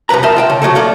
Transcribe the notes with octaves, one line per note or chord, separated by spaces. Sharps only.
C2 F2 C3 B4 A#5
A#4 C5 D#5 E5 A5
F4 G5 A5
C#3
C3 F#3 A3 A4
F4 A4 D5